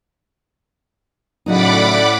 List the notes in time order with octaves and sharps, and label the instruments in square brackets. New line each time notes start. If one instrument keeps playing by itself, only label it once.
[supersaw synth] A2 D5 [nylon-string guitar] C#3 F#3 D#4 [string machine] F#5 B5 D6